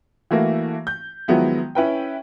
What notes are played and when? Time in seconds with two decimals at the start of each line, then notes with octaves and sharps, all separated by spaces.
0.31 E3 A3 A#3 E4 F#4
0.87 G6
1.28 D#3 F3 F#3 G#3 B3 E4
1.75 C#4 E4 B4 G5